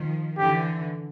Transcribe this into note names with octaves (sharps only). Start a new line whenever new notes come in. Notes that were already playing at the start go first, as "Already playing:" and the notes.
Already playing: D#3 F3
D3 E3 G4